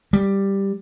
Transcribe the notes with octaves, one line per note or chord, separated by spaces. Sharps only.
G3